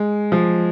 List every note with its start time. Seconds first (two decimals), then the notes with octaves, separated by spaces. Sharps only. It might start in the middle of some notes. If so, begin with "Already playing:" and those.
Already playing: G#3
0.32 F3